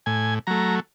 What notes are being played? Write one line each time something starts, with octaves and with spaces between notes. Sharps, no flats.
A2 G#5
F#3 A3 A#5